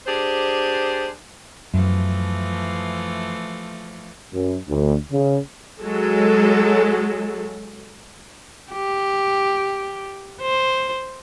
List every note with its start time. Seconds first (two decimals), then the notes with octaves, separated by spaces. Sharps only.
0.07 D4 G4 G#4 C5
1.74 F#2 E3 F3 A3
4.34 F#2
4.69 D2
5.11 C#3
5.81 F#3 G#3 A4
8.72 G4
10.42 C5